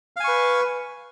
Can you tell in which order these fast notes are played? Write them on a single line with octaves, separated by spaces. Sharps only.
F5 G#5 C#6 B4